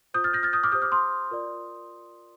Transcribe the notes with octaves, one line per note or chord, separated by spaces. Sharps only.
F4 C5 D#6 G6
F6 A6
G6 A#6
F6 A6
D#6 G6
D6 F6
G4 C5 D#6 G6
D6 F6
C6 D#6
F4 A#4 D5